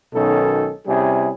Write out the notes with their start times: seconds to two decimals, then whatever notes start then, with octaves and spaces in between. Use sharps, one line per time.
0.13 B1 B2 D#3 C#4 D#4 A4
0.87 C3 G3 C#4 E4 G#4